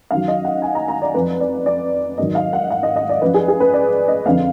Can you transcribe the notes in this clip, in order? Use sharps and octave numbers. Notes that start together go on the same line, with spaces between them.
F#2 D#3 F#3 F5
D#5
F#5
G#5
A#5
A#5
D5
F2 F3 B4
D5
D5
G#2 D#3 F#3 D#5
F5
F#5
F5
D#5
D#5
D5
F#2 F3 B4
G#4
G#4
B4
D5
D#5
F2 D3 F3 F5